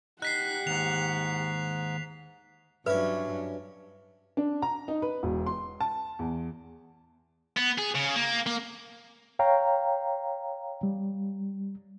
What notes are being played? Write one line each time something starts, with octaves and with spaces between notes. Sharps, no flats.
D#4 G4 F#5 F#6 B6 C7
D#2 G#2 F7
G2 F#3 C#4 E4 B4
D4
A#5
D#4
B4
E1
C6
A5
E2
B3
G#4
C#3
A#3
A#3
C#5 F5 G5 A#5
G3